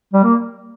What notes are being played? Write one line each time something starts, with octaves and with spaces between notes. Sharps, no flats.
G3
A#3